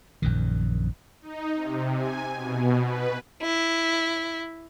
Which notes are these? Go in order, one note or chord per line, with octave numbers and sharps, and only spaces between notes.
A#1 F#2 D#3
D#4
C3
G#5
B2
B4
E4